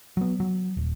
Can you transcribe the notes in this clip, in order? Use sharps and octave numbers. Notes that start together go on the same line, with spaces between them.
F#3 B3
F#3
D#1